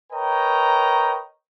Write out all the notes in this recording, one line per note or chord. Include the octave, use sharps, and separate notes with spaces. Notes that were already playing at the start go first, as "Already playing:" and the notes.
A#4 B4 C#5 D#5 G5 A#5